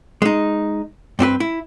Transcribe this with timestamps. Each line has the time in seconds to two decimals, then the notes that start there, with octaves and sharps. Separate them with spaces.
0.22 G#3 D#4
1.19 G2 C4 G4 B4
1.40 E4